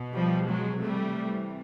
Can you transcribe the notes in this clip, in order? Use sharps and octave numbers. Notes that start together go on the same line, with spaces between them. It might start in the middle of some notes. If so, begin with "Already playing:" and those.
Already playing: B2
F3 G3
F#3 G#3
C3 E3 G3 A3